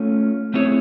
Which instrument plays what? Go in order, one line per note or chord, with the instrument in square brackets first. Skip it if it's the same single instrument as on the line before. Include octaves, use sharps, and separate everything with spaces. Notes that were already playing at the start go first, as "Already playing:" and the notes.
Already playing: [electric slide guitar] A3 C#4 F4
A3 C4 E4 G#4 C#5